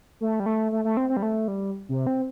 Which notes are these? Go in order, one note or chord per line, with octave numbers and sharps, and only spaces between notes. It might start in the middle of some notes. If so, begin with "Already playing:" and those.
A3
G3
A3
A3
A3
C4
C4
G3
A3
G3
C3
C4